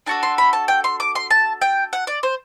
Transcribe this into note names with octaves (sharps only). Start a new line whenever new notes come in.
D4 F#4 A4 A5
C6
B5
A5
G5
C6
D6
C6
A5
G5
F#5
D5
C5